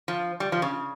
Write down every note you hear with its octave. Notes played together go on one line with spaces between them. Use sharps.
F3
G3
F3
C#3